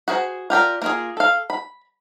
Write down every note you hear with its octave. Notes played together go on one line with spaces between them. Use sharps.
F#4 G#4 A#4 C5
F4 G4 A#4 D5
A#3 F4 G#4
A4 F5
B5